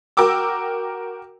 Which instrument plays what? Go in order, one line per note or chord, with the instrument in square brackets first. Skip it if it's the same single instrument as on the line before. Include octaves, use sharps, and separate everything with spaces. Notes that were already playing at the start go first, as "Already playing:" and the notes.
[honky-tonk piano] F#4 A#4 G5 D6 E6